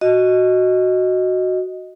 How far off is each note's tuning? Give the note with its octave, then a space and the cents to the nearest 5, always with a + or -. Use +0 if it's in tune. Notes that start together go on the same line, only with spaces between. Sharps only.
F#4 +0 D#5 +0